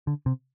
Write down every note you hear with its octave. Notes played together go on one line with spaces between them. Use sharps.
D3
C3